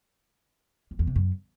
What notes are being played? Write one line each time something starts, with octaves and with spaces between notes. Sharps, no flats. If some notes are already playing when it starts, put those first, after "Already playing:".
F2
E2
C3
F#2